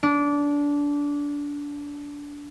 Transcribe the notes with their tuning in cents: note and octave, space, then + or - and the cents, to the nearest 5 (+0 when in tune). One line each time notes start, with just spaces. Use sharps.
D4 -20